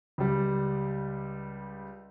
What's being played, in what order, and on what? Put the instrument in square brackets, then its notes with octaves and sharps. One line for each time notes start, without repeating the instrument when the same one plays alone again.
[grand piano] C#2 G3